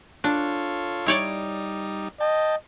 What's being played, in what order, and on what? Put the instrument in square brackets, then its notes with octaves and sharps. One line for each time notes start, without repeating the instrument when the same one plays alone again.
[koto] D4 [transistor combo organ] F4 A4 C#5
[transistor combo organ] G3 D#4 [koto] E4 C#5 D5
[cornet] D#5 [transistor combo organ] G5 A5